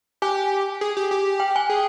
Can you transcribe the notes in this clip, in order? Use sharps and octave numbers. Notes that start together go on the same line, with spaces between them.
G4 G#5
G#4
G4
G4
G5
G#5
G#4